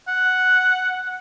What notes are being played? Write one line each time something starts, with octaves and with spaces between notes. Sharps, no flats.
F#5